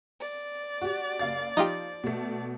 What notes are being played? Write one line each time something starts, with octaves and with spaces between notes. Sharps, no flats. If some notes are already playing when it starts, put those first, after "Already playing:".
D5
F#4 G4
F#1 F5 A6
F3 D#4 F4 G4
B2 A3